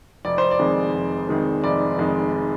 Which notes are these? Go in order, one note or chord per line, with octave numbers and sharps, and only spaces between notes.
F1 D5
C5
D5
F2 D#3 G#3
F1
F2 D#3 G#3
F1 D5
F2 D#3 G#3